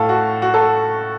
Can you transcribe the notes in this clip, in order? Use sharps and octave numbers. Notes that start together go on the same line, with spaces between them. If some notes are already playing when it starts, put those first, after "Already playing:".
Already playing: A2 A3 A4 F5
F#4
F#4
A4